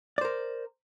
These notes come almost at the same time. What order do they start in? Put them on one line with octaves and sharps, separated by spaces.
D5 C5 A#4